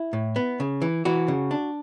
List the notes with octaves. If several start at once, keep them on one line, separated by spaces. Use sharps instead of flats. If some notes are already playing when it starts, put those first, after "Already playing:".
Already playing: E4
A2
B3
C#3
E3
E3 F#4
C#3
D4